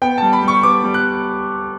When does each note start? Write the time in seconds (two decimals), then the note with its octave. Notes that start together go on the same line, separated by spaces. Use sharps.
0.02 B3 G5
0.18 G3 A5
0.33 B5
0.43 G3 C#6
0.63 B3 D6
0.84 G3
0.94 F#6